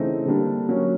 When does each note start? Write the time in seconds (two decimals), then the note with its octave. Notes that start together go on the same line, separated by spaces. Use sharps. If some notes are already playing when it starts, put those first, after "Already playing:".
Already playing: C#3 E3 A3 C4 D#4
0.26 D3 G3 A#3 D4
0.69 F#3 A#3 C#4 F#4